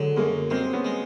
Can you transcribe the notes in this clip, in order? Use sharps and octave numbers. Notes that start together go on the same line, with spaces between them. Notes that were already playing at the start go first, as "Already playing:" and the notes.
Already playing: D3 F#3 G#3
F#2 G#3 A#3
G#3 A#3 C4
B3 C#4
G#3